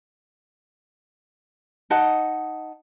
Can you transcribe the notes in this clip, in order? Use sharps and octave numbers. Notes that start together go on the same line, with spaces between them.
D#4 D#5 F#5 A5